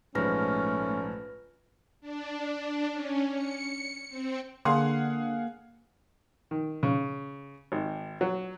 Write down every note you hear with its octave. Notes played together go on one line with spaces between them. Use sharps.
A#1 G#2 A3 C#4 B4 F6 A#6
D4
C#4
C#7
C4
D3 A#3 G#4 F5 F#5 C6
D#3
C#3
G#1
F#3